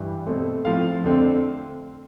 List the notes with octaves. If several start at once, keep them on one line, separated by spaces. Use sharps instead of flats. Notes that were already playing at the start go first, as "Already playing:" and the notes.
Already playing: G2 E3 G3
B2 A3 C4
A2 F3 C4 F5
F2 D3 A3 C4